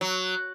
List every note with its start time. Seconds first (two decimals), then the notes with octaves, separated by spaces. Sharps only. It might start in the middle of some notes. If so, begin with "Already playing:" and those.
0.01 F#3